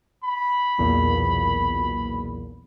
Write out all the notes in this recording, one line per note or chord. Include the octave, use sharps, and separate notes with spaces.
B5
B1 E2 A#2